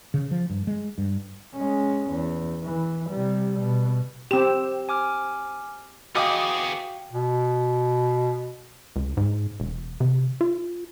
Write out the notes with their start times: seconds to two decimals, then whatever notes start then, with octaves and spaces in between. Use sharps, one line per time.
0.14 C#3
0.31 F3
0.50 G2
0.67 G#3
0.98 G2
1.55 G#3 C#4
2.11 E2
2.64 E3
3.10 C3 G3
3.60 B2
4.31 C4 G4 E7
4.89 G#5 D6 F6
6.15 B3 F#4 G#4 D#5 F5 G5 D6 D#6
7.13 B2
8.96 C#2
9.17 G#2
9.60 E1
10.00 C3
10.41 F4